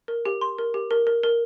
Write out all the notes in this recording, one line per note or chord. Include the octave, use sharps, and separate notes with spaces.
A#4
G4
C6
A#4
G4
A#4
A#4
A#4